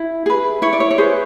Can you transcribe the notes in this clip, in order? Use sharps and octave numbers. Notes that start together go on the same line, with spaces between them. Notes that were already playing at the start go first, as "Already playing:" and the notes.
Already playing: E4
G#4 B4
E4 C#5
D5
C#5
C#5
G#4 B4 C5